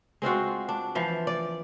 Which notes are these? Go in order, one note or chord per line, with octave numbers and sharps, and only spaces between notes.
G#3 C4 F4 F#4
D4
E3 F3
D5